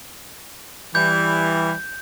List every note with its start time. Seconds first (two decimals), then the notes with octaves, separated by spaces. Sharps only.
0.95 E3 G3 G6